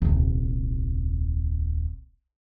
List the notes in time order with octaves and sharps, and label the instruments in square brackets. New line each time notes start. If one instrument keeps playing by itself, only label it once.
[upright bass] D#1 C2